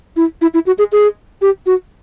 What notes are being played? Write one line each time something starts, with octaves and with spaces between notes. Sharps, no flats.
E4
E4
E4
F#4
G#4
G#4
G4
F#4